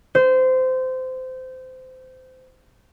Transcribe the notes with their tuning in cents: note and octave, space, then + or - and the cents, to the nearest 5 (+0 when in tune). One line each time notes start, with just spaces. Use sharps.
C5 -20